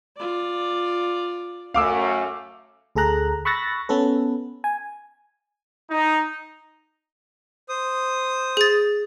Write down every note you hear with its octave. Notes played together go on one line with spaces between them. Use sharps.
F4 D5
F#2 A3 F5 D6 E6
D2 G#4 A4 A#5 F#6
B5 C#6 E6 F#6 A6 A#6
B3 C#4 A4 B4
G#5
D#4
C5 D#6
G#4 A6